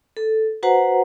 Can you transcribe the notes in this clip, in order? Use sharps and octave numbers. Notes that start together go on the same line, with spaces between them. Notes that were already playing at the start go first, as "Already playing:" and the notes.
A4
F#4 B4 C5 F#5 A#5